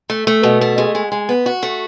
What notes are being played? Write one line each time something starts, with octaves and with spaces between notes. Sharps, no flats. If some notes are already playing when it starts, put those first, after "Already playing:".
A3
A3
B2
A3
G#3
G#3
G#3
B3
F#4
A3